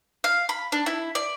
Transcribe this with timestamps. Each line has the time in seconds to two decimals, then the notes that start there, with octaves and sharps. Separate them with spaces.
0.24 F5
0.49 B5
0.72 D4
0.86 E4
1.15 D5